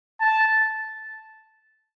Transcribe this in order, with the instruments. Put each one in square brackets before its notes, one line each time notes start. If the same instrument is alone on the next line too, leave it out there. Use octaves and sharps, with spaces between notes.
[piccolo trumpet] A5